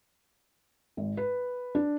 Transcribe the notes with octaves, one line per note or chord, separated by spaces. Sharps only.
G#1
B4
D4